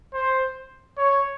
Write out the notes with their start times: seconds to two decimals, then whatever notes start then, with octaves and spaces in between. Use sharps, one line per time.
0.14 C5
0.97 C#5